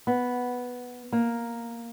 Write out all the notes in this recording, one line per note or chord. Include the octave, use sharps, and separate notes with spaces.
B3
A#3